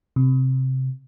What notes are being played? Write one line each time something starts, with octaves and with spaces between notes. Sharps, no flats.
C3